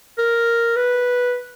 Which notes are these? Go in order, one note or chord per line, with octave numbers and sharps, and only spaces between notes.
A#4
B4